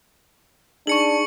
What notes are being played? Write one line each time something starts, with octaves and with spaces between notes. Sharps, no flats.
D4 D#4 G#4 C#6 C#7 F#7